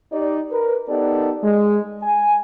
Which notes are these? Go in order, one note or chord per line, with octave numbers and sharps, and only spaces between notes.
D#4 G4 D5
A#4 B4
B3 D#4 G4 A4 A#4 D5
G#3
G#5